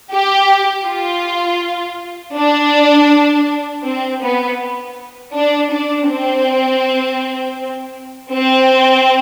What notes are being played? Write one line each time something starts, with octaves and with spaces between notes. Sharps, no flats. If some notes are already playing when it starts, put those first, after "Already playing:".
G4
F4
D4
C4
B3
D4
D4
C4
C4